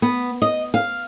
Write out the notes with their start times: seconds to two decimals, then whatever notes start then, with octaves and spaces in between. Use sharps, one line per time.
0.02 B3
0.42 D#5
0.74 F5